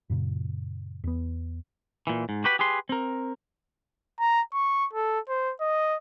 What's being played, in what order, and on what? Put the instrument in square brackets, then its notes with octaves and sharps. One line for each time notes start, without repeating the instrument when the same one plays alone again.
[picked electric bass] F#2 A#2 C#3
E2 B3
[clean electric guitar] A#2 E3
G#2
F#4 G4 B4 B5
G4 G#4 B4 C6
C4 A#4
[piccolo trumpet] A#5
C#6
A4
C5
D#5